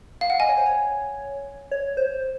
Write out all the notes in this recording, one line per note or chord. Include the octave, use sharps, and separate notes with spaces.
F5
F#5
D#5 G#5
C#5
C5
C#5
C#5
C5